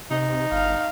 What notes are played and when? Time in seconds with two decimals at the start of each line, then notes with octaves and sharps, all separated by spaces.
0.11 C3 D#4
0.52 G1 F5